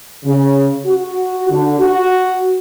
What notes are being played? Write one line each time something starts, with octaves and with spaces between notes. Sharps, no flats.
C#3
F#4
D3
F#4